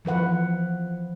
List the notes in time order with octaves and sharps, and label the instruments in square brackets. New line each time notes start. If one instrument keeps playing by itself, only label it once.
[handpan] E3 F3 B4 F#5